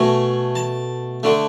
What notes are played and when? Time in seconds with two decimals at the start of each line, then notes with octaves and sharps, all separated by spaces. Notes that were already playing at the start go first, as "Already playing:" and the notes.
Already playing: B2 A3 G#5
0.55 A5
1.23 D3 A3